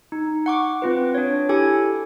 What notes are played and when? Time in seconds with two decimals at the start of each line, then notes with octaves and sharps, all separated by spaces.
0.12 D#4
0.46 F#5 C#6 D6
0.82 C4 F4 B4
1.15 D4 C#5
1.49 E4 G4 A4 G#5 G#6